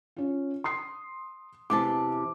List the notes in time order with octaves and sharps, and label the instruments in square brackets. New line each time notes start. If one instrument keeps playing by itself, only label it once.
[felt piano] C#4 F4
C6 D#6 C7
[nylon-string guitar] E2 C3 A5 [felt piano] D6